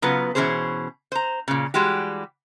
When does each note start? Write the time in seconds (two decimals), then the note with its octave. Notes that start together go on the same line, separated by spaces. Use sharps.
0.02 C#3 F#3 B3 F4 B4
0.35 B2 E3 A3 C#4 G#4 C5
1.12 C5 A#5
1.48 A#2 C#3
1.74 E3 G3 G#3 F#4 G4